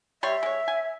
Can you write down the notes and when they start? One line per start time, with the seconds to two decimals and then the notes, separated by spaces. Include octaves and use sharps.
0.23 G3 C#5 E5 C6
0.43 G#3 C#5
0.68 G#5